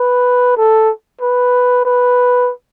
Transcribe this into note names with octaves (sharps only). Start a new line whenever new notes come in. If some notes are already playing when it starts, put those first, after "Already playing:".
Already playing: B4
A4
B4
B4